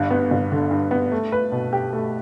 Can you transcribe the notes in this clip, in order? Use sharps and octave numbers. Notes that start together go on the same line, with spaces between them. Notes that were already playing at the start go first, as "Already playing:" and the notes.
Already playing: G1 G2
B3
G1
D3
G2
B3
A3
B4
B2
G4
A3